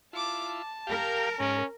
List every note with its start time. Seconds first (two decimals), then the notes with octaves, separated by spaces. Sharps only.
0.13 E4 F4 A5 D6
0.47 A5
0.87 G4 A#4 F5
1.40 G#2 C#4